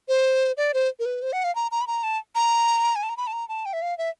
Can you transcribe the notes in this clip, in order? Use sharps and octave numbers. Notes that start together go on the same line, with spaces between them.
C5
D5
C5
A#4
B4
C5
F#5
F5
A#5
A#5
B5
A#5
A5
A#5
G#5
A5
A#5
B5
A5
A#5
A5
G5
E5
F5
E5